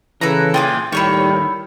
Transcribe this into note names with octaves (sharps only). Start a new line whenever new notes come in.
C#3 E3 A4 B4 A#5
A#2 F4 G#4 G5 D6
D#2 A2 D#3 G3 E4 C#5 C#6